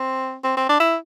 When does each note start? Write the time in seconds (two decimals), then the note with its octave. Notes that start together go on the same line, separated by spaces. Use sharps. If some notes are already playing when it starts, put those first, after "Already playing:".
Already playing: C4
0.44 C4
0.57 C4
0.69 D4
0.80 E4